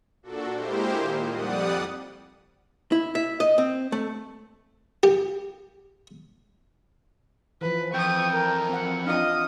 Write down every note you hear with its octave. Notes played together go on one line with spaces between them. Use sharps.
A#2 D4 F#4 A4
G#3 A#3 E4 G4 C5
A#2 D#3
F2 G3 D5 F#5 D#6
E4
E5
D#5
C4
A3
G4
E3 F3 B4
F2 G5 C#6 D#6
A#4
C4 F#5
D4 F4 D#5 F5 D#6